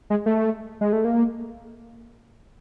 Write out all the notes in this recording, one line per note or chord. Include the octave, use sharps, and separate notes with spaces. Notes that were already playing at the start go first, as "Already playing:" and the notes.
G#3
A3
G#3
A3
A#3